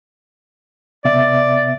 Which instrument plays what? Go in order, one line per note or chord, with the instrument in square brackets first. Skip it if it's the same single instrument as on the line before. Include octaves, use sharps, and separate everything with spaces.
[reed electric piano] C3 B3 E5 [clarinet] D5